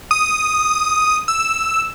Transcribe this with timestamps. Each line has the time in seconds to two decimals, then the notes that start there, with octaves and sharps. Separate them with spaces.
0.11 D#6
1.28 E6